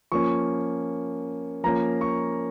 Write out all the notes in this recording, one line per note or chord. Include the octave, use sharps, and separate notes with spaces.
F3 A#3 C#4 C#6
F3 A#3 C#4 A#5
C#6